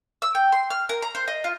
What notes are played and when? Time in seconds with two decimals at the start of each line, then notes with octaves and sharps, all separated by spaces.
0.22 E6
0.35 G5
0.52 C6
0.70 F6
0.89 A#4
1.02 A#5
1.15 C5
1.28 D#5
1.44 F4